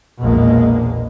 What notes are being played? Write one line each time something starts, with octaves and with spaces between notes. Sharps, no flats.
A#1 E2 B2 G#3 A#3